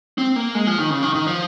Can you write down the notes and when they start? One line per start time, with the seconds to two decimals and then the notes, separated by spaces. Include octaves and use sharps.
0.18 C4
0.36 A#3
0.55 G#3
0.67 F3
0.78 D#3
0.90 C#3
1.03 D#3
1.14 D#3
1.26 F3